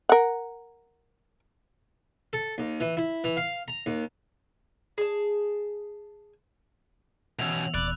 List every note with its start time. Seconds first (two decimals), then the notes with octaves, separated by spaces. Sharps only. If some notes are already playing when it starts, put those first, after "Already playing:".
0.09 A#4 F#5
2.33 A4
2.58 D#2
2.80 E3
2.97 E4
3.24 E3
3.37 F5
3.68 A#5
3.86 D#2
4.98 G#4 A5
7.39 B2 E3 B3 C#4 E6 F7
7.74 D#1 D5 B5 F#6